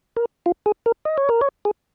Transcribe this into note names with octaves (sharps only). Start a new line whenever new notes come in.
A#4
F4
G#4
A#4
D#5
C#5
A#4
C#5
G#4